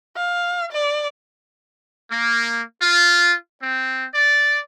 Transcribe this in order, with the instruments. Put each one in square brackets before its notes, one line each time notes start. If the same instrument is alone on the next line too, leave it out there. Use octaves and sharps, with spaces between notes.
[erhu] F5
D5
[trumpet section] A#3
F4
C4
D5